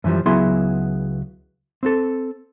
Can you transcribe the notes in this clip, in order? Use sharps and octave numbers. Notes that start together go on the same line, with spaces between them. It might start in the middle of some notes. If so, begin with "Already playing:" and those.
F#2 E3 F3 G3
C#2 F#3 B3 E4 G#4 C6
C4 A4